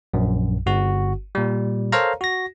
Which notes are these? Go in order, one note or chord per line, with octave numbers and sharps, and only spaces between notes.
A#1 F#2
G1 F#4
A#2 G3
A4 A#4 C5 C#5 F5 A#5
F#4 A#6